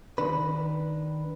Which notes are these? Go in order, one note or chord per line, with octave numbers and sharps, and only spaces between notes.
D#3 D4 B4